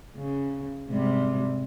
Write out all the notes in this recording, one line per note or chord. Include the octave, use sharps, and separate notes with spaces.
C#3
G#2 C3 G3